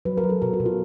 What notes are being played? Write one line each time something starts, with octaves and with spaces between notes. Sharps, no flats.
F#3 B4
A#4
F#3
A4
B2 A#4
F#4
B2
F4